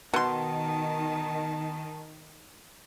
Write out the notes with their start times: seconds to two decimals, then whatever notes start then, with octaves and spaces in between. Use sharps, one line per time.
0.14 B2 D#3 A5 C6